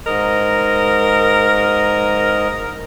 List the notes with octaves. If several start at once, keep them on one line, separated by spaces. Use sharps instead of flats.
G#2 A#4 D#5